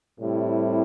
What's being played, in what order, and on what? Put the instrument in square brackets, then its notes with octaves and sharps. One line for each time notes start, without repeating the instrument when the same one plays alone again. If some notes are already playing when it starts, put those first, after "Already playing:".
[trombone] A2 [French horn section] C3 G3 C4 E4